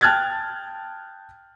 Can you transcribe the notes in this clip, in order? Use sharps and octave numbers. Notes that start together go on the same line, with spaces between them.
G5 A5 F6 F#6 G#6 A6